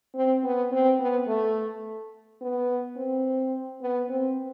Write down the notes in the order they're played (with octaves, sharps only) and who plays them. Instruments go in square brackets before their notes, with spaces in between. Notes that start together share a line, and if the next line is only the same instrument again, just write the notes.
[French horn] C4
B3
C4
B3
A3
B3
C4
B3
C4